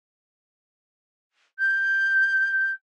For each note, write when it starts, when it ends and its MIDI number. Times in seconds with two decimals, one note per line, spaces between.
1.59 2.71 91